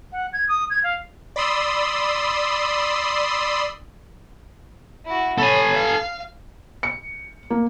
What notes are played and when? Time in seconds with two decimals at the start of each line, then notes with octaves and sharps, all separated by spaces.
0.12 F#5
0.33 G#6
0.49 D#6
0.70 G#6
0.84 F5
1.36 D5 B5 C6 D#6 E6
5.06 E4 F#4
5.38 A4 C#5 G#5 B5
5.74 F5
6.83 C#7
7.50 A#3